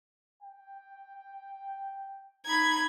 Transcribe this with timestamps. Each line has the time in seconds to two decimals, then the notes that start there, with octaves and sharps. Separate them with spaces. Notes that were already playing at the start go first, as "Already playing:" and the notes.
0.42 G5
2.46 D#4 A#5 B5 G#6